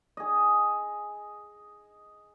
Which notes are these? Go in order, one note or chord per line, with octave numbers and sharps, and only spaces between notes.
G#4 D#5